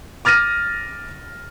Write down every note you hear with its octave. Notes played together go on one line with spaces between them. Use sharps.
D6 F6 A6 A#6 D#7